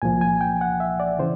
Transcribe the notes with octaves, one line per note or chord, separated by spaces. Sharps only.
C2 A#2 F3 G#5
G#5
G5
F#5
E5
D5
C#3 E3 C5